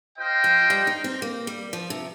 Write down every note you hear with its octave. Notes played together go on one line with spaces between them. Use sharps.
F4 C5 D#5 G5
F3
G3
D#4
C4
A#3
G3
F3
C3